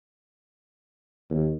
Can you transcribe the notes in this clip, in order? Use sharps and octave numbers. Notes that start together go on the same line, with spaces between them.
D#2